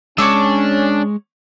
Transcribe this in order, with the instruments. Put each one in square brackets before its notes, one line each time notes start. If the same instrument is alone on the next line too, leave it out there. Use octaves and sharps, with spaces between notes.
[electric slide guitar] G#3 [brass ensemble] C#4 [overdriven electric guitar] D4 [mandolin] C#5 D6 E6